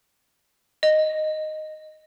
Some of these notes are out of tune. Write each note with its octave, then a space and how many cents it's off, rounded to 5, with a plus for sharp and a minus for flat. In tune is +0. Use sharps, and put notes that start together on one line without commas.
D#5 -5